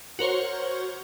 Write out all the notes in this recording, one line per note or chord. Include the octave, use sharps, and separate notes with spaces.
F#4 A#4 C5 C#5